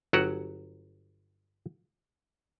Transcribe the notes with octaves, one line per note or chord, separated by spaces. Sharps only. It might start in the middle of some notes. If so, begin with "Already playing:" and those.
G1 F#3 F#4 G4 F#5